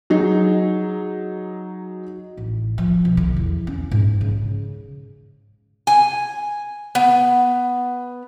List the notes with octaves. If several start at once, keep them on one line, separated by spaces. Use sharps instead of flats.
F#3 D#4 G#4
A1
F3
B1
D3
E2
C#4
G#2
C#3
G#5
B3